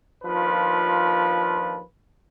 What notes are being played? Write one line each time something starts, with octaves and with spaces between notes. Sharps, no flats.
D#2 F3 D4 F4 B4